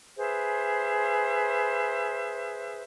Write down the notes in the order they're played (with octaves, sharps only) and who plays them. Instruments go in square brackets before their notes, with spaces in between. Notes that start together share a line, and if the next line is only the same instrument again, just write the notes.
[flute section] G#4 B4 C5 E5